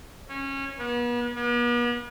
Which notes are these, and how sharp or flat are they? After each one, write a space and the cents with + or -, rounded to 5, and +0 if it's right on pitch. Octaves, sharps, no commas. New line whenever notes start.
C#4 -20
B3 -40
B3 -45